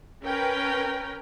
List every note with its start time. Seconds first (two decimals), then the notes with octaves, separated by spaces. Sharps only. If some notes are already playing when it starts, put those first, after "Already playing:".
0.23 C#4 A#4 B4 G5